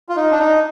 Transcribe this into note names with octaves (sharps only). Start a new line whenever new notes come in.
F4
D#4
D4
D#4